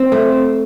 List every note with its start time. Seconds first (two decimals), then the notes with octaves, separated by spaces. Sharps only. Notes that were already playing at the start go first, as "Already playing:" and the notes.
Already playing: C4
0.12 A3